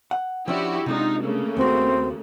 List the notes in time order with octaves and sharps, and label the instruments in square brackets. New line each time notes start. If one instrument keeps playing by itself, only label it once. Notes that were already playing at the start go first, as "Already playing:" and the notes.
[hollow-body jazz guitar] F#5
[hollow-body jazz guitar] F3 C#4 D4 [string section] E4 F#4 G4
[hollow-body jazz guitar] C3 G#3 D4 [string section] D#4 F4
[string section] C#3 A3 A#3
[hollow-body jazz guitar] D#2 F#4 [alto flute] C4